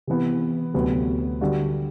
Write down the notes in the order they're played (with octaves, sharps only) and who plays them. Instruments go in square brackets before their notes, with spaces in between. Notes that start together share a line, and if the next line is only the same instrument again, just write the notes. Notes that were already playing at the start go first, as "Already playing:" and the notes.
[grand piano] C3 E3 B3
D2 C3 F#3 B3
D3 G3 D4 F#4